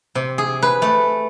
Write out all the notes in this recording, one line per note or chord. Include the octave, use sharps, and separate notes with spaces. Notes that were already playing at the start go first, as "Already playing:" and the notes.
C3
G#4
B4
A3